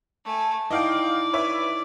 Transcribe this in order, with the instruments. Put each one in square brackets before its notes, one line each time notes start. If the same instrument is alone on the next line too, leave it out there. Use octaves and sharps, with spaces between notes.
[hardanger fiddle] A3 G#5
[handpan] D#4 E4 [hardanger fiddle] D5 [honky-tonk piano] D#5 F5 G5
[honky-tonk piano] B4 C#5 E5